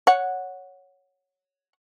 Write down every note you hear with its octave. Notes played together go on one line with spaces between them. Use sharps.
C#5 F#5